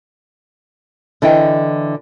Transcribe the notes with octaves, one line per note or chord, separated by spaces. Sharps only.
D3 E3 E4 D#5 G5